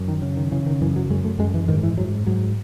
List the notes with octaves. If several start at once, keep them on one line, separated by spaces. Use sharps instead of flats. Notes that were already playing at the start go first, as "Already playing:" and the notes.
Already playing: F#2
D#3
C#3
D#3
C#3 E3
D#3
F#2 E3
F#3
F#2 G#3
A3
F#2 G#3
E3
G#2 D#3
E3
G#2 F#3
G#2 F#3